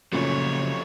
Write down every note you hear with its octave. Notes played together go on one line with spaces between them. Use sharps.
A#2 C#3 F3 F#3 A3 C#4 C#5